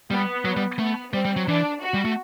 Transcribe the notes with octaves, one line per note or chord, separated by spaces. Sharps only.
G3 B3
F#3
G3
A3 B3
G3 C4
G3
F#3
E3 D4
F#4
G3
A3